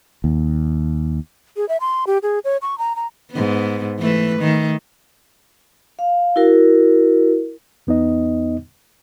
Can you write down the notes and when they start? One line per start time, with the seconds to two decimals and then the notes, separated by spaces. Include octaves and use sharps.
0.24 D#2
1.57 G#4
1.69 E5
1.81 C6
2.07 G4
2.23 G#4
2.45 C#5
2.62 C#6
2.78 A#5
2.96 A#5
3.31 G#2 B3
3.99 E3 A3 B4
4.40 D#3 A3
5.99 F5
6.36 E4 F#4 A#4
7.87 E2 B3 D#4 D#5